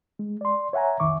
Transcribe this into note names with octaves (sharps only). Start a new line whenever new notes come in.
G#3
D5 C6
C#5 E5 F#5 G#5 A#5
C2 F2 D#3 E5 C#6 D6